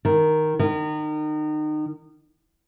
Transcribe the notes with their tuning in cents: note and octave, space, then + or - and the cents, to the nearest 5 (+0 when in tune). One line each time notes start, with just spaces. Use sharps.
D#3 +0
D#3 -30